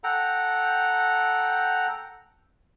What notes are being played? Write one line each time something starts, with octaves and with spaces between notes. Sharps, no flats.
A4 F#5 G5 A#5